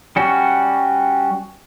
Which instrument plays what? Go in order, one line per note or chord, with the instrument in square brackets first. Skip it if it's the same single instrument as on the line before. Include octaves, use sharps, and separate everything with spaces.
[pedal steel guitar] G3 C#4 F#4